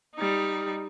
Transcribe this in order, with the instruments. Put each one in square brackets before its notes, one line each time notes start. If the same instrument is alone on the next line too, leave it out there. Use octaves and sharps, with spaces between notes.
[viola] G3 D#4